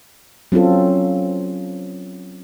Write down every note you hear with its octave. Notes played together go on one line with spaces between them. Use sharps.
F#3 C4 C#4 F4 A4